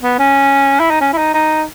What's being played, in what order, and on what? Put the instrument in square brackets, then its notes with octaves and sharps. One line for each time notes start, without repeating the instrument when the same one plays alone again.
[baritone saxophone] B3
C#4
E4
D#4
C#4
E4
D#4
D#4